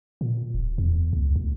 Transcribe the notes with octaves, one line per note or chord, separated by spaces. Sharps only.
A#2
D1
E2
C#2
D2